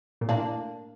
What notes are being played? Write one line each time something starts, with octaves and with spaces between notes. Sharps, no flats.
A#2
A2 A#3 D4